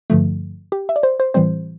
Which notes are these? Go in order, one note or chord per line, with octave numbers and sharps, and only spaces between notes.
G2 D3 F3 A3
G4
E5
D5
C5
C5
A2 E3 G3 C4 C5